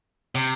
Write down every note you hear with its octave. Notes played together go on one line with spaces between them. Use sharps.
C3